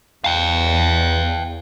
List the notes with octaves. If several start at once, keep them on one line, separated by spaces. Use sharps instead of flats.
E2 F5 G5